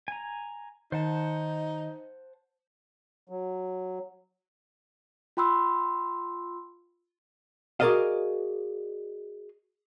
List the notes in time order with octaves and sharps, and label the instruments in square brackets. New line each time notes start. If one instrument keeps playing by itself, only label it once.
[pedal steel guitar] G#5 A#5
[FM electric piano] D#3 [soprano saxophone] D#4 [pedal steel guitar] C5 F#5 A5
[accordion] F#3
[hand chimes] F4 G5 B5 C6 E6
[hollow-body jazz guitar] F#4 G#4 A#4 D5 D#5 F5